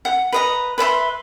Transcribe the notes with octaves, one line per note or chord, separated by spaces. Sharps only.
F#5
B4 D#5 A#5
B4 D5 E5 C6